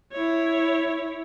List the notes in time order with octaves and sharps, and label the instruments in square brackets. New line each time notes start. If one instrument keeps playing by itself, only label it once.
[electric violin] E4 C#5